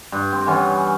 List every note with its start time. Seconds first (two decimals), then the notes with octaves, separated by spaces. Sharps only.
0.12 G2
0.33 C4
0.47 E3 B3 C#4